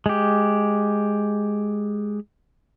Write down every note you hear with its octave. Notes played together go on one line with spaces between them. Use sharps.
G#3 G4